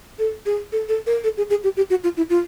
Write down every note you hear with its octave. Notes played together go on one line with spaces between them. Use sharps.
A4
G#4
A4
A4
A#4
A4
G#4
G#4
G4
G4
F#4
F4
E4
F4